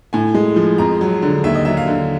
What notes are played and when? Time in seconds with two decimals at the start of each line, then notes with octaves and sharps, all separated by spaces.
0.13 A2 G#5
0.34 G#3
0.56 F3
0.78 F2 A#5
1.01 F#3
1.22 D3
1.44 D#2 E5
1.55 D#5
1.65 F#3 E5
1.77 F5
1.87 D3